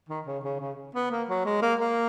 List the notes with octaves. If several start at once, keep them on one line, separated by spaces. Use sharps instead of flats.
D#3
C#3
C#3
C#3
B3
A#3
F#3
G#3
A#3
A#3